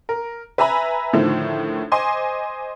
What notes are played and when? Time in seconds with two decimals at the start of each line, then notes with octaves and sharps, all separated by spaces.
0.09 A#4
0.58 B4 E5 G#5 A#5 B5
1.13 A2 D3 D#3 F3 A3
1.92 C5 D#5 G#5 C6 D6